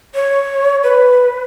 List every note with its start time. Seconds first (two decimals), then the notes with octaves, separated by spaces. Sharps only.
0.15 C#5
0.83 B4